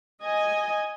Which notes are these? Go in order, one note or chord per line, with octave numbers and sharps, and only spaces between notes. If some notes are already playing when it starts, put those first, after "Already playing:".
D#5 G#5